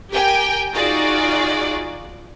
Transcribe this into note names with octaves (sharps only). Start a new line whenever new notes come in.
G4 A#4 G5 G#5
D#4 F4 F#4 G#4 D5